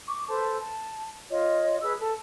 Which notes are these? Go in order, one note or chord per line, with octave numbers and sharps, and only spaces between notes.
C#6 D6
A4 B4 C5 A5
A5
F4 C#5 D#5
G#4 B4 E6
A4 A5